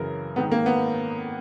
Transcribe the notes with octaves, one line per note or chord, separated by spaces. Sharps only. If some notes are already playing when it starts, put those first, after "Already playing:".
Already playing: F#2 C#3 E3 A#4
G#2 D#3 B3
A#3
B3